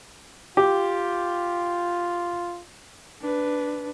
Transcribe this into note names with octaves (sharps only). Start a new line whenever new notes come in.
F4 G4
D4 B4